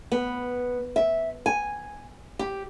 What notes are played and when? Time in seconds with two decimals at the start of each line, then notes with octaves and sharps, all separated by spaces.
0.12 B3
0.96 E5
1.46 G#5
2.39 G4